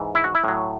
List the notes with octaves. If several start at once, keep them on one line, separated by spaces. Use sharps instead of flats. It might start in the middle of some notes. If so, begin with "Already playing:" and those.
Already playing: G#2 E3
E4
F#4
E4
A2 F#3